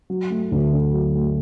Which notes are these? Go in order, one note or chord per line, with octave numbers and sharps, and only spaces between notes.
F#3
A3
D2
D3
F#3
A3